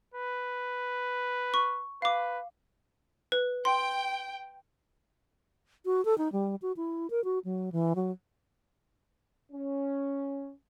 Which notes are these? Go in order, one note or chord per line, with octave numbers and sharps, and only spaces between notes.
B4
C#6
B4 F5 D6
B4
G5 C6
F#4
A4
D#4
G3
F#4
E4
A#4
F#4
F#3
E3
F#3
C#4